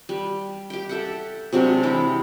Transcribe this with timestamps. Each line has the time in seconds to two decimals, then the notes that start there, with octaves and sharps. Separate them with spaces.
0.09 G3
0.70 G4 G5
0.89 A4 E5 F#5
1.52 C3 F#3 G#3 D4
1.83 E3 E4 D6